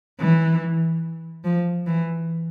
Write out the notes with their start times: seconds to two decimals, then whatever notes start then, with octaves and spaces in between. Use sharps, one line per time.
0.20 E3
1.44 F3
1.86 E3